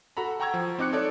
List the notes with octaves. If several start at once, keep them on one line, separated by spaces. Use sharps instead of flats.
F#4 A4 A#5 B5
F#5 G5 A#5 C#6 E6 G#6
F3
C4 D#4 D6 F#6 C#7
D#4 A4 C#5 D5